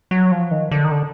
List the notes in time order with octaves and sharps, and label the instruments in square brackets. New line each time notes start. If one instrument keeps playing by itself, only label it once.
[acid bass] F#3
F3
D#3
D3
D#3
D3